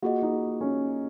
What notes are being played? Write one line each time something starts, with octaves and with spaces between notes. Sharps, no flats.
A#3 F4 F#4 G#4 D#5
D#4
C#4